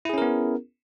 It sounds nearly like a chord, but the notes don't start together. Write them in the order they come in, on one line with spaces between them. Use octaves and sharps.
E4 G#4 C#4 A#4 B3